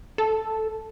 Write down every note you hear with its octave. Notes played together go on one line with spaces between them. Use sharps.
A4